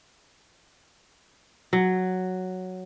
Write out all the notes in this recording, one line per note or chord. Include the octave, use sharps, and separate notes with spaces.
F#3